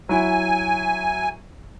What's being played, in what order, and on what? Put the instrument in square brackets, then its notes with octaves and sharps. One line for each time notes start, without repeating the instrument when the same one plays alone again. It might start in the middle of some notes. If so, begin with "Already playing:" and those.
[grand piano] F#3 E4 [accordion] G#5